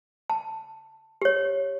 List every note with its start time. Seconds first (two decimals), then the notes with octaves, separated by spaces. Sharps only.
0.30 A5
1.22 G4 C#5